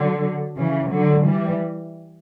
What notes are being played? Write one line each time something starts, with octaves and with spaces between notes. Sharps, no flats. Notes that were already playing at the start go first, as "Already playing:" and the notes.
Already playing: D3 F#3
C#3 E3
D3 F#3
E3 G3